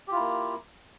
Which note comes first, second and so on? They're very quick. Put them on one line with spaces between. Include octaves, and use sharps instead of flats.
G4 F4 E4 A#3